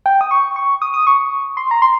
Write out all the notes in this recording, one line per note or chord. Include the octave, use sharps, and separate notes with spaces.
G5
D#6
C#6
C#6
D#6
D#6
C#6
C6
A#5
C6